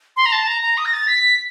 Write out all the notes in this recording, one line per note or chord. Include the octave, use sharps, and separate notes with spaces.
C6
A#5
A5
A#5
A#5
D#6
A#6
A6
B6